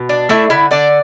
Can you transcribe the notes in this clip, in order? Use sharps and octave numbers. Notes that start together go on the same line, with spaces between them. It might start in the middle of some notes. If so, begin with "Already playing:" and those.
Already playing: B2
D4
A3 E4 E5
D3 E4 E5
D3 D4 D5